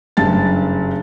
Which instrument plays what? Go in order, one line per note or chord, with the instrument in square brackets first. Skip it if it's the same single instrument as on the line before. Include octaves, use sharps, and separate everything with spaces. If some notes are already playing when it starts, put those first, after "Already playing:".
[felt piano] F#1 G2 A5 A6